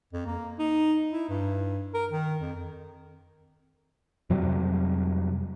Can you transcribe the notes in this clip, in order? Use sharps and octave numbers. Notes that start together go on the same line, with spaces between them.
F2
A#3
D#4
E4
G2
A#4
D#3
F2
F2 C3 F#3 G3